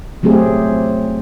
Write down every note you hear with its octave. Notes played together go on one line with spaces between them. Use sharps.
F#3 A3 C4 G4 G#4